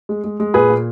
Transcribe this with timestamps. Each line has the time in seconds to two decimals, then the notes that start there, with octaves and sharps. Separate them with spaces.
0.09 G#3
0.24 G#3
0.40 G#3
0.54 A#2 G#4 B4
0.70 A#2